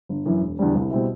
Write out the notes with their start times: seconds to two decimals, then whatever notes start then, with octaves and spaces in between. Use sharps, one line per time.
0.09 G1
0.26 F#2 E3
0.41 E1
0.59 E2 D3 G3 D4
0.75 C2
0.90 B2 G3 C4 E4